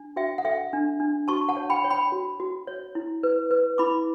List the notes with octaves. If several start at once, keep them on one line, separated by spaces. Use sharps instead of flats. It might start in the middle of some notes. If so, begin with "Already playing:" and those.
Already playing: D4
F#4 E5 G5
F#5
A4 E5 G5
D4
D4
F#4 A5 C#6
F#5 A5
C#5
G5 B5
C#5
G5 B5
F#4
F#4
C#5
E4
B4
B4
E4 B5 D6